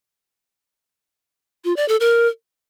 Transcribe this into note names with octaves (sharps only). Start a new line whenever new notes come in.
F4
D5
A4
A#4